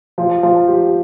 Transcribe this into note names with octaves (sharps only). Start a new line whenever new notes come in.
F3
F3
G4